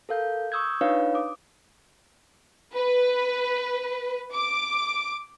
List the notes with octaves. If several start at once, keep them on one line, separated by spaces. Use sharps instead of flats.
A4 A#4 F5 G6
C#6 D#6 E6 G6 G#6
D4 D#4 F4 B4 C#5 F5
D6 D#6
B4
D6